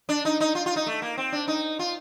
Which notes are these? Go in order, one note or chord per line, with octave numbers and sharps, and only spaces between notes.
D4
D#4
D#4
F4
F4
D#4
A3
A#3
C4
D4
D#4
F4